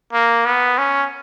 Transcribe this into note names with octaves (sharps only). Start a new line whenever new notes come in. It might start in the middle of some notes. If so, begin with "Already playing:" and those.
A#3
B3
C#4